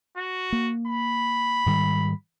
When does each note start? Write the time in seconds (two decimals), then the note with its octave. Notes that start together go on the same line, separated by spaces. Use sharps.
0.17 F#4
0.52 A#3
0.87 B5
1.66 G#2 D#3 G3